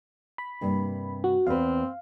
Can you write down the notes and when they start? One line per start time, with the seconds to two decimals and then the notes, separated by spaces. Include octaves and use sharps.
0.38 B5
0.61 G2 C3 A#3
1.24 F#4
1.47 E2 C4 B4 F5